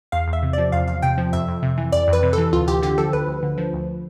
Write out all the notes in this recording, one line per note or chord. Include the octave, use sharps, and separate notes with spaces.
E2 F5
E2
E5
C3
F3 D5
E2 F5
E2 F5
C3 G5
F3
F2 E5
F2
C3
E3
F2 D5
F2
B4
C3
A4
E3
D2 F4
D2 G4
D3 G4
F3 A4
D2 B4
D2
D3
F3
D2